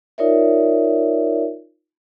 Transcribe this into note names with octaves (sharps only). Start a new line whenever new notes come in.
D#4 F4 A#4 C#5 D5 E5